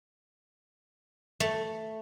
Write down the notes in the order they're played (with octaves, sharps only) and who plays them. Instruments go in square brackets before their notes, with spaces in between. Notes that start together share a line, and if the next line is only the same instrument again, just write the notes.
[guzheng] A3